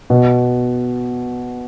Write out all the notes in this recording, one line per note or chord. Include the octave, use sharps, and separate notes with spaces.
B2